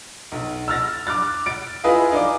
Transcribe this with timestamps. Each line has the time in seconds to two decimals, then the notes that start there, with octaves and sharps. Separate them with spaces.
0.32 B1
0.68 E6 F6 A6 A#6
1.07 D6 F6 F#6 A6
1.46 A6 D7
1.84 E4 F4 G#4 B4 D#5 F5
2.12 D#4 G#4 D5 D6